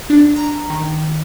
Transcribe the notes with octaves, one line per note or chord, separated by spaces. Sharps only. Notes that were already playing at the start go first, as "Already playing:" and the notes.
D4
A#5
D#3